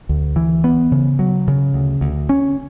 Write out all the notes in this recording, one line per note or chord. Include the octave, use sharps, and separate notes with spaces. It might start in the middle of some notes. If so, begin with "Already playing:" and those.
D2
E3
B3
C#3
F#3
C#3
D2
D2
C#4